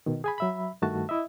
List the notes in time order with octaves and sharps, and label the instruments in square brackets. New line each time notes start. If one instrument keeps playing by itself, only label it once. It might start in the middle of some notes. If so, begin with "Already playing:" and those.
[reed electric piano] B2 D#3
G#4 G#5 B5
F#3 E5 B5
G2 D#3 A3 F#4 A5
E4 D#5 E5